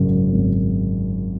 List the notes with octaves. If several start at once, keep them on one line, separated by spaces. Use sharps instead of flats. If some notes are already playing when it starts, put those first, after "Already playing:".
Already playing: G#1 F#2 C#3
G#1